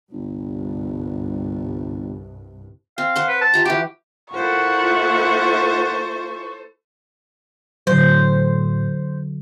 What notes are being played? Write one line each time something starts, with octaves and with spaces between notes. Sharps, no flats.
G1 C2 G2
C4 F5
C5 F#5 C6
B4
A5
F4 G4 A#5
E3 F#4 G4
A#3 E4 F4 A4 C5 F#5 C#6
E2 A2 D3 F#3 C5